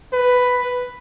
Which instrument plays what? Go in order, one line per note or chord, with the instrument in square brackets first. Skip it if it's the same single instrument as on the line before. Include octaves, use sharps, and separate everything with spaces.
[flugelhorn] B4